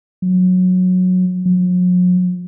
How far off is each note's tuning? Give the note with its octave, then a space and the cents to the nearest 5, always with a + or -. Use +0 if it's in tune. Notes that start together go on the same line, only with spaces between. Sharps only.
F#3 -15
F#3 -45